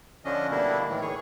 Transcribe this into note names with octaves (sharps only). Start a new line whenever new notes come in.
D3 F3 C#4 D4 D#5
B2 D3 G3 A#3 D4 E4
A2 D#3 E3
G#4 C#5